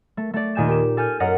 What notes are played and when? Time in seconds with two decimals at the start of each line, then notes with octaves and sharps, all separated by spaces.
0.17 A3
0.34 A3 D5
0.55 D#2 A#2 D#3 G#5 G6 E7
0.68 G4 E7
0.97 A4 G#5 F6 G6
1.20 F#2 A#4 D#5 F#5 D#6 F6